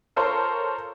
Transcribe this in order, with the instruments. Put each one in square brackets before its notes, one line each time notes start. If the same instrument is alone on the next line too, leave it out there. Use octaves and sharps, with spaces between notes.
[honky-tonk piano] F4 A4 A#4 C5 C#5 C6